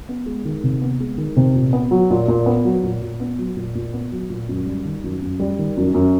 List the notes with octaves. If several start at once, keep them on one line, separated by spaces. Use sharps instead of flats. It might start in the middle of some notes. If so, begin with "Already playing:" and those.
B3
G#3
D#3
C3
B3
G#3
D#3
C3
A#2
B3
F#3
A#2
A#2
B3
F#3
A#2
A#2
B3
F#3
A#2
A#2
B3
F#3
A#2
F#2
G3
D#3
F#2
F#2
G3
D#3
F#2
F#2